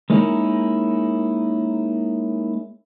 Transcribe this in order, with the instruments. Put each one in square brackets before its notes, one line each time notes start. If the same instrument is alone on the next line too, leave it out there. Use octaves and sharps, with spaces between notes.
[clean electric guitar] G#3 A#3 C#4 D#4 E4 A#4